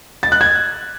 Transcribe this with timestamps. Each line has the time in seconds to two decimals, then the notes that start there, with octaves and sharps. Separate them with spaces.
0.23 A6
0.32 F#6
0.41 G#6